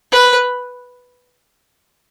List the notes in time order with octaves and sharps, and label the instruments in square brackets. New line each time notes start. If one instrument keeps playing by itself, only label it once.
[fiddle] B4